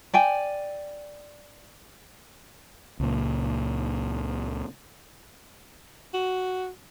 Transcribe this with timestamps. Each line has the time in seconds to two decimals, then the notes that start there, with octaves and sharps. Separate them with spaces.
0.14 D5 G5 G#5
3.00 C#2 A#2
6.14 F#4